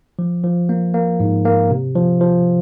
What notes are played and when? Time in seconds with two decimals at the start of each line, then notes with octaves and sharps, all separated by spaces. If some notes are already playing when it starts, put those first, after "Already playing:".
0.19 F3
0.44 F3
0.69 A#3
0.94 A#3
1.20 G#2
1.45 A#3
1.70 C3
1.96 F3
2.21 F3